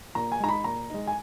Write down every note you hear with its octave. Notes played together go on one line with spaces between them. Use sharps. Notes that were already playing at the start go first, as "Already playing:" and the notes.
A#2 A#5
G#5
G#3 D#4 A#5
B5
A#2 A#5
G#3 D#4
G#5